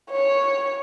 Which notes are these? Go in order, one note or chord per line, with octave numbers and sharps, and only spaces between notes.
C#5